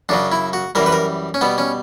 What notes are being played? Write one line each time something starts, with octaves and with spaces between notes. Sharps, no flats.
F#2 C#3 F#3 D4
E4
F#4
F#2 E3 G3 A#4
B4
A#4
C#4
B2 G3 B3
C#4